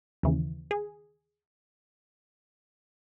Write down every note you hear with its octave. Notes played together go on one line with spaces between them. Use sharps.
D#2 C#3 E3
G#4